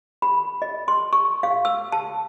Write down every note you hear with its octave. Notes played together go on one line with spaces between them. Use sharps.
B5
D#5
C6
C#6
F5
E6
A5